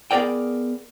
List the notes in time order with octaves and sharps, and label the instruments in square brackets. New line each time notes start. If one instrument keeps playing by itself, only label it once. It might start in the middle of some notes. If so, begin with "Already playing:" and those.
[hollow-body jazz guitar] B3 G#4 A#4 D5 G5